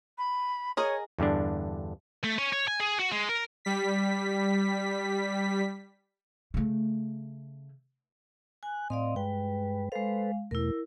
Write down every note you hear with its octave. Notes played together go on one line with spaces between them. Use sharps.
B5
G#4 A#4 C#5 D#5
E2 G2 D3 D4
A3
C#4
C#5
G#5
G#4
F#4
G#3
A#4
G3 B6
C#3 A3
G#5 F#6
A2 C4 D5 D#5 F5 C6
G2 G#3 B4 G5
G#3 A4 B4 C5 F5
E2 B2 A3 E4 A#4